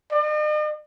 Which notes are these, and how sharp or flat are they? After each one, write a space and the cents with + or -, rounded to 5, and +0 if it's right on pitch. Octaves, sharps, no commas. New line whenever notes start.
D#5 -45